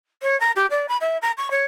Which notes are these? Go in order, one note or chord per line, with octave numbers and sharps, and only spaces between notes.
C#5
A#5
G4
D5
B5
E5
A#5
C#6
C#5